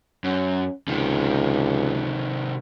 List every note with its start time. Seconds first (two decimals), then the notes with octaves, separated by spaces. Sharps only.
0.24 F#2 C#4
0.88 C#2 C3 D#3